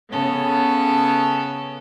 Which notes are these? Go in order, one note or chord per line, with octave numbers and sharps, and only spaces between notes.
C#3 B3 C#4 A4